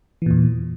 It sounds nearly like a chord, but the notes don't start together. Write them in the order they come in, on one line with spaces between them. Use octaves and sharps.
E3 A#2 E2